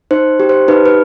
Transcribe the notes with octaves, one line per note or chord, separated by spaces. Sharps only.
D#4 C5
G4
C5
D#4 B4
B4